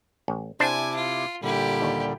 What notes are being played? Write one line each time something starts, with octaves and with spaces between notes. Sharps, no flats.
A1
C3 D4 E4 C5 G#5 A5 D6
F4
A#2 D3 G3 E4 G4
D#2